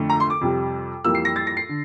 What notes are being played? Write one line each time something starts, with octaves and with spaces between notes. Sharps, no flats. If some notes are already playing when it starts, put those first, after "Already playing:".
Already playing: F2 D3 A3
A#5
C6
D6
F2 C3 G3
F2 E3 G3 A#3 E6
C7
A#6
A6
A#6
C7
D3